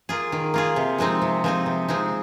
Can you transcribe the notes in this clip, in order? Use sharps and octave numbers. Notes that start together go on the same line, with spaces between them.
A#3 F4 G#4
D#3
A#3 F4 G#4
C3
F3 G#3 C4 D#4
C3
F3 G#3 C4 D#4
C3
F3 G#3 C4 D#4